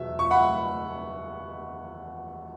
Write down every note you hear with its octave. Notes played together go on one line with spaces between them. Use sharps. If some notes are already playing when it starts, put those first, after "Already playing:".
Already playing: E2 B2 F#3 E5
C#6
F#5 B5